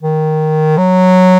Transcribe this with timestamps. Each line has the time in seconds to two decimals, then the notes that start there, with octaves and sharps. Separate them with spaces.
0.03 D#3
0.77 F#3